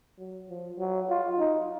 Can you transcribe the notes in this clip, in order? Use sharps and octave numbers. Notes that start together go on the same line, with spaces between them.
F#3
F3
F#3
F4
D#4